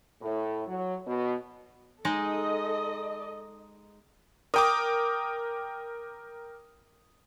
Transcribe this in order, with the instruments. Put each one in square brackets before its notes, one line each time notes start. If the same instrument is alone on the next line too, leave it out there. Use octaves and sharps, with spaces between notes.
[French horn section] A2
F#3
B2
[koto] G#3 D#4 [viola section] A4 D#5
[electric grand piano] A#4 G5 D6 [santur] D#6